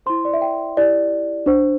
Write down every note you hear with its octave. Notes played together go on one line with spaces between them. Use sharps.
E4 C5 C6
D5
E5
G5
E4 G4 D5
D4 C5